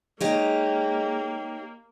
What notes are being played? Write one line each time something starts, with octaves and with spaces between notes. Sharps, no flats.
G#3 A#3 D#4 G4 C#5